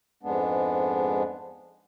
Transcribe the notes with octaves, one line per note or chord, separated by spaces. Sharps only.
F2 G#2 G#3 B3 D4